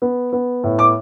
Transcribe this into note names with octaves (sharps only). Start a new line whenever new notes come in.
B3
B3
A2
D6